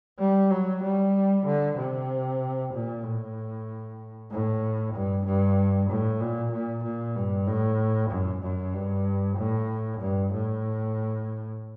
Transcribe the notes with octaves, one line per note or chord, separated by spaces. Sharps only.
G3
F#3
G3
D3
C3
A#2
A2
A2
G2
G2
A2
A#2
A#2
A#2
G2
A2
F#2
F#2
G2
A2
G2
A2